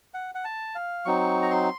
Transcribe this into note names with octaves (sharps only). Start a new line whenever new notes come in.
F#5
F#5
A5
F5
F#3 C4 D#4 C#6
A#5
C6